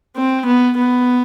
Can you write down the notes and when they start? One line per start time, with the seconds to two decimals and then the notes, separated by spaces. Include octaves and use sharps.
0.16 C4
0.47 B3
0.77 B3